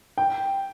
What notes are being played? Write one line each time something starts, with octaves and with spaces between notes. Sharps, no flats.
G5